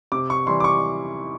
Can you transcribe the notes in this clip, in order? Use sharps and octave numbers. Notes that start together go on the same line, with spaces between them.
C3 D6
C#6
E3 G3 C6
D6
C#6